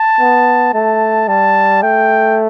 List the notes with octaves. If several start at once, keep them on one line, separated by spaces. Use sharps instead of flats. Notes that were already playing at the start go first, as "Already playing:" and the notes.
Already playing: A5
B3
A3 A5
G3 A5
A3 G5